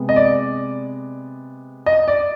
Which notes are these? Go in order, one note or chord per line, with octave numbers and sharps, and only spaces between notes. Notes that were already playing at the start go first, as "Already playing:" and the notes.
Already playing: C3 G#3 B3
D#5
D5
D#5
D5